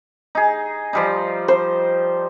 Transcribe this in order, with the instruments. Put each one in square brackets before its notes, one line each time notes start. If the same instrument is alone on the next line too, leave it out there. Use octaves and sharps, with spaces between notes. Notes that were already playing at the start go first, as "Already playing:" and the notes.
[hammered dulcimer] D#4 G#4
F3 G3 D#4
[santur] C5